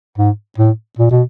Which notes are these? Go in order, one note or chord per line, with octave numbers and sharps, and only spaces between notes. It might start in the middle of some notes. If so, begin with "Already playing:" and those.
G#2
A2
A#2
B2